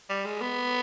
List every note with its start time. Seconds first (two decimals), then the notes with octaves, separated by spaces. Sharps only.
0.09 G3
0.25 G#3
0.41 B3